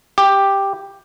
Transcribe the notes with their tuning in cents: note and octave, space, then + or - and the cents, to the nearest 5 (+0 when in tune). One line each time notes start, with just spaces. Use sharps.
G4 +5